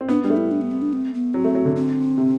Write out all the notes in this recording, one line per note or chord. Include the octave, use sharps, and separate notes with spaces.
C4
B3 D4
G3 D4
A3
E4
D4
B3
C4
D4
C4
B3
F#3 C4
A3
F#3
D3
C4
C3